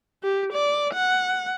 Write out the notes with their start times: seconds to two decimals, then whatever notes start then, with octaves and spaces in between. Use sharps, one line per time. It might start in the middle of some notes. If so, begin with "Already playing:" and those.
0.23 G4
0.53 D5
0.94 F#5